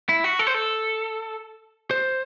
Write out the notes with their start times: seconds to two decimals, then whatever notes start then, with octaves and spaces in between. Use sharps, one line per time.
0.09 E4
0.24 F#4
0.39 A4
0.47 C5
0.54 A4
1.91 C5